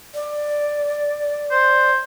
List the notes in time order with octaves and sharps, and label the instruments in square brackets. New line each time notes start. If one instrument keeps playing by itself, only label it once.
[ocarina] D5
[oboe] C5